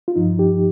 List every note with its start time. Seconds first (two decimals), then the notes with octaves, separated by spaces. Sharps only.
0.08 F4
0.16 G2 F3 D#4
0.39 G4